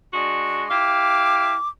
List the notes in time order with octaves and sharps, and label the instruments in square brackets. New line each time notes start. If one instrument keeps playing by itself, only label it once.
[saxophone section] G#3 D4 F#4
[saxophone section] E4 G4 F5 [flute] D6